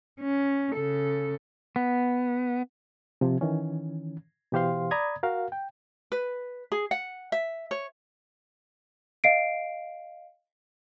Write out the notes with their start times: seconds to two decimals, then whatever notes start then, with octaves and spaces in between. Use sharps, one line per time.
0.21 C#4
0.75 C#3 A4
1.76 B3
3.21 C3 F3
3.41 D#3 E3 C#4
4.52 B2 E3 G4 C5 F5 C6
4.91 D5 A#5 B5 D#6 G#6
5.23 F#4 A#4 F5
5.52 G5
6.12 B4
6.72 G#4
6.91 F#5
7.32 E5
7.71 C#5
9.24 D#5 F5 C7 D7